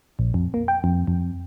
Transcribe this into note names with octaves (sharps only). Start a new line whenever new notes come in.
A#1
F2
A#3
G5
F2
F2